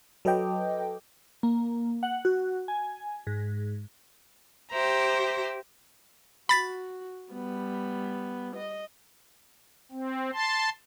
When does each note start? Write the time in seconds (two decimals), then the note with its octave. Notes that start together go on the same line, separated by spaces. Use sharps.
0.25 F#3 A4 B4 D#5 G5 D6
1.43 A#3
2.03 F#5
2.25 F#4
2.68 G#5
3.27 G#2
4.71 G4 C5 E5 A#5
6.49 F#4 B5 A6 B6
7.32 G3 B3
8.56 D#5
9.92 C4
10.33 A5 C6